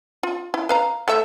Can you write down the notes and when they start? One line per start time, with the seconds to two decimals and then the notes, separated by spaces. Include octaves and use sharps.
0.23 F4
0.54 E4
0.69 B4 F5 A#5
1.08 A3 A4 E5